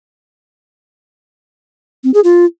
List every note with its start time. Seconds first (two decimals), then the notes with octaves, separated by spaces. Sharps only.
2.04 C4
2.14 G#4
2.24 F4